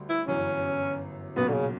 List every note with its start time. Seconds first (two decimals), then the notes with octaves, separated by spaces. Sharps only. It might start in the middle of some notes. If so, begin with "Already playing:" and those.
Already playing: D2 D3 G3
0.09 E4
0.27 G1 F#2 E3 C#4
1.36 B1 A#2 F#3 B3 C#4
1.48 D3
1.54 C#3